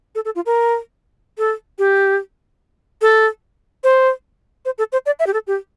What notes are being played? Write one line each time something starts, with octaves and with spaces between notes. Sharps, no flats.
A4
A4
F4
A#4
A4
G4
A4
C5
C5
A4
C5
D5
E5
G4
A4
G4